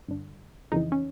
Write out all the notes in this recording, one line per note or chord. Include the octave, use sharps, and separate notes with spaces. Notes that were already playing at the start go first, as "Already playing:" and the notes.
G2 D3
F2 C#3 E3 D#4
C#4